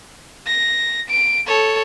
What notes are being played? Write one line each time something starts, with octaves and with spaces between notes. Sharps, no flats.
A#6
D7
A4 C#5